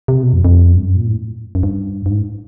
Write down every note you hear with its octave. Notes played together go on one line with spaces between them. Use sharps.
C3
B2
F2
F2
G2
F#2
A#2
A2
F#2
G2
G2
G#2